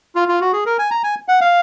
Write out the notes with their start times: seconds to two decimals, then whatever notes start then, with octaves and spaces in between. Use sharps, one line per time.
0.15 F4
0.28 F4
0.41 F#4
0.53 G#4
0.66 A#4
0.79 G#5
0.91 A#5
1.04 G#5
1.28 F#5
1.41 F5